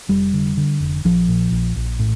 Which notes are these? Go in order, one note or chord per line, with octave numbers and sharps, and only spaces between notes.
F1 G3
D3
D3
F1
A#1 F3
A#2
A#1
A#1
A2